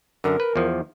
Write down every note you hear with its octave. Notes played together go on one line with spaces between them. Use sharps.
F#2 D3 A#4
B4
E2 F3